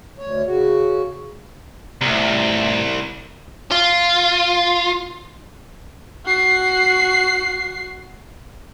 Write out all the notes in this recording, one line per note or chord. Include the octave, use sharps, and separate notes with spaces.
D2 C#5
C#3 F#4
C2 A2 C3
F4
F#4 C7